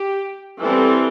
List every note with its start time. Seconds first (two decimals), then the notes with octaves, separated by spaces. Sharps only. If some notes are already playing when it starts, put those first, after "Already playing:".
Already playing: G4
0.60 E3 G3 C4 A4